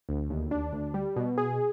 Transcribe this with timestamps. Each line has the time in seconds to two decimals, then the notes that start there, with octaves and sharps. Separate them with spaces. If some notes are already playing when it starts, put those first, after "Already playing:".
0.09 D2
0.30 D#2
0.51 D4
0.73 D2
0.94 G3
1.16 B2
1.38 G#4